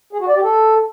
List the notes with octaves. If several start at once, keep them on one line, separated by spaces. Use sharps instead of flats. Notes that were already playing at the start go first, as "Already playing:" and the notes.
G#4
F#4
D5
G4
A4